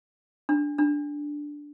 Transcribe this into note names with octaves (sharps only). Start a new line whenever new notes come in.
D4
D4